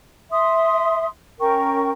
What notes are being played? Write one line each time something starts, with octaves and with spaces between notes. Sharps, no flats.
E5 C6 D#6
C#4 A#4 G5 C#6